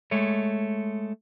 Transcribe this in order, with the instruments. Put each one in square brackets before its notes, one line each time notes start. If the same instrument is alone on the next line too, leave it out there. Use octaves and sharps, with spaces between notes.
[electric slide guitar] G#3 A3 C#5